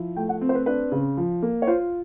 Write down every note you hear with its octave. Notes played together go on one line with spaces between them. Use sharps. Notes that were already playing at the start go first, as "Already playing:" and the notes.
Already playing: F3 E4
A3 G5
F#5
C4
C5
B4
D4 B4
C#3
F3
A#3
C#5
F4 C5